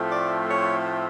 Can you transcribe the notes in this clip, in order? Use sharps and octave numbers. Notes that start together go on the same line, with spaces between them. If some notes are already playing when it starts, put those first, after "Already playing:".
Already playing: A2 F3 A3 C4
D5
C#5